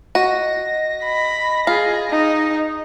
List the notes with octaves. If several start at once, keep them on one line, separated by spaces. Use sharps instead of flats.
F#4 D#5 A#6
B5
F4 G#4
D#4